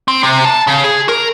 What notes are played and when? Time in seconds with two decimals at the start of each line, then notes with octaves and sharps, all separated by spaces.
0.08 C4
0.23 C3
0.45 A5
0.67 C#3
0.84 G#4
1.09 A#4